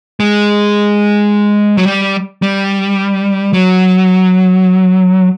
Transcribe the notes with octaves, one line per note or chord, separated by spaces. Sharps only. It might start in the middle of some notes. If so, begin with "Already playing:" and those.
G#3
F#3
G3
G3
F#3